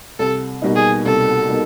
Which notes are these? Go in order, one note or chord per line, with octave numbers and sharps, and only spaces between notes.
C2 A4
B2 G3 A#3 D#4
G#4
C2 A4
B2 G3 A#3 D#4